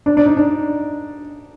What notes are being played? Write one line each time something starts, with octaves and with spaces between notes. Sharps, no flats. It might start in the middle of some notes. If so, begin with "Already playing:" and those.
D4
D4
D#4
D4